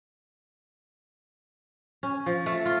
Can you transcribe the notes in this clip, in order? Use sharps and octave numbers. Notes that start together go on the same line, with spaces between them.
C#4
F3
A3
F4